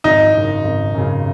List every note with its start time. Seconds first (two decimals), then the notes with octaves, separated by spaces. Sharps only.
0.04 G#1 D#4
0.34 F#2 C#3
0.64 G#1
0.94 F#2 C#3